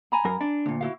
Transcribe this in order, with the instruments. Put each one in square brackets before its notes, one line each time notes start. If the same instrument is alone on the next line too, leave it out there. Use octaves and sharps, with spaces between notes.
[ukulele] G#5 A#5 B5
[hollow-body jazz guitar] F#2 A#4
D4
[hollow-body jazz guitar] D2 A#2 [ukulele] D4
[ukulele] E4 F#4 F5